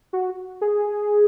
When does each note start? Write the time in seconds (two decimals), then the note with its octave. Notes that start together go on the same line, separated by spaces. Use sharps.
0.13 F#4
0.61 G#4